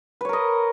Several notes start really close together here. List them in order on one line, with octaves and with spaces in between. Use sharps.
B4 C#5 A#4 D#5